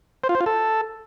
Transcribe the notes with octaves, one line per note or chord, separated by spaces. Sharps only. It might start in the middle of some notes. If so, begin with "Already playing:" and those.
C5
F4
C5
F4
A4